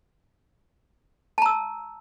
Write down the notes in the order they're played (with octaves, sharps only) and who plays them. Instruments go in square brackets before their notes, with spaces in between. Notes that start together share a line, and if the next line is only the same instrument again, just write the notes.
[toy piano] A5
A#5
E6